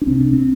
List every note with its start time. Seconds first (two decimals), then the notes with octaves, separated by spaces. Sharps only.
0.02 D4
0.07 C2 C3 C4
0.21 D4
0.33 C4